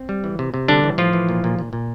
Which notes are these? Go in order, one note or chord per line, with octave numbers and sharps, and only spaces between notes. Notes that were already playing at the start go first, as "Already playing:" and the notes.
Already playing: C4
G3
E3
C3
C3
D3 G3 D4
E3
A2 F3 F4
E3
A#2
A#2
A#2
A#2